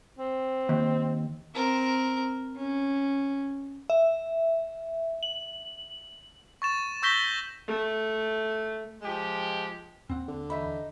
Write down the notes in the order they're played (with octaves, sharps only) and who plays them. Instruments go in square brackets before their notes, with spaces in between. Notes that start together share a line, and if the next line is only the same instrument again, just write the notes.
[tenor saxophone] C4
[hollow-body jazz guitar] D#2
[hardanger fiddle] C4 A#4
C#4
[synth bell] E5
F#7
[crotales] C#6 A6 E7
C#6 E6 G6 A#6 B6 G7
[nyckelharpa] A3
[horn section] F3 G#3 G4
[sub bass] D#2 [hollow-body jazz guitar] C4 F#5
[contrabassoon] D3
[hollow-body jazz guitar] E3 E5 B5 [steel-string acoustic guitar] D#4